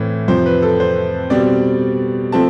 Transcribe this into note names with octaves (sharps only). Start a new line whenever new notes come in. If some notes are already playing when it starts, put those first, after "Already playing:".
Already playing: A2 E3 A3 C4
F2 C3 F3 C5
B4
A4
C5
B2 G3 C4 D5
F3 A3 C4 A5